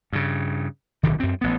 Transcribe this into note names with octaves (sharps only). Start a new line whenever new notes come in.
G2 C#3
D1 B1 D3 D#3
F#2 C4
A1 B3